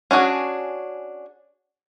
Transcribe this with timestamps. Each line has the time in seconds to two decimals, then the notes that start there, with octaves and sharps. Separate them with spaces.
0.11 C#4 D4 F#4 G#4